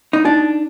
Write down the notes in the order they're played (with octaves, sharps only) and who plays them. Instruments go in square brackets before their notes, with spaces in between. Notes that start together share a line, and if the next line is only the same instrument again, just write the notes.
[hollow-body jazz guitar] D#4
[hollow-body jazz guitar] D4 [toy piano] D#4